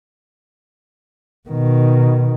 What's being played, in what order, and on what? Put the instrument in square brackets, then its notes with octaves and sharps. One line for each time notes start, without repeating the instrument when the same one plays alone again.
[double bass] B2 D#3